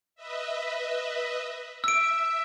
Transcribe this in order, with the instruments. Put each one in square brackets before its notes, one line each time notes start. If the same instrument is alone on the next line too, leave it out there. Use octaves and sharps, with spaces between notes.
[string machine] B4 D#5 E5
[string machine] E5 [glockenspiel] E6 D7